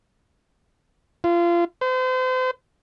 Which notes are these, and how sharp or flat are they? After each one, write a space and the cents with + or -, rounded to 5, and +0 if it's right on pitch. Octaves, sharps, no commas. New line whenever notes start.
F4 -25
C5 -35